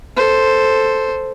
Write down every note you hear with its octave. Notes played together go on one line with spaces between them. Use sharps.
A4 C5